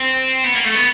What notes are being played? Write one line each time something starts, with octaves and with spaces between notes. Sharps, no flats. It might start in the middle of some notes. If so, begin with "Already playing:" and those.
Already playing: C4
B3
A#3
A3
B3